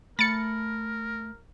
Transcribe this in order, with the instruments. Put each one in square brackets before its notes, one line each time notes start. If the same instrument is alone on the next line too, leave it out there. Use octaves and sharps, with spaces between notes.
[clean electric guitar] A3 B5 [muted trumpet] A#4 [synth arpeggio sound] A6 C#7